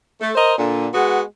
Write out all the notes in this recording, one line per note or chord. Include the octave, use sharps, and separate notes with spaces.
A3
A#4 C5 D#5
A#2 D3
G#3 B3 F#4